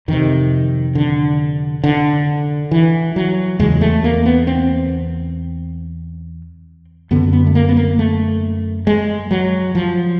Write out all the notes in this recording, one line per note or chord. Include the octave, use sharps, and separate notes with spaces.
F2 C3 D#3
D3
D3
E3
F#3
E2 C#3 G#3
A3
A#3
B3
C4
F#2 D3 B3
B3
A3
A#3
B3
A#3
A3
G#3
F#3
F3